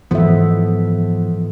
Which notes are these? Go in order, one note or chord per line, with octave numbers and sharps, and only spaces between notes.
G#2 E3 F3 B3 A4 E5